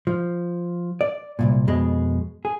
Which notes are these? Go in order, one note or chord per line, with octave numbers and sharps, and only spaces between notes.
F3
D5
C2 F2 A#2
F2 B2 G#3
G#4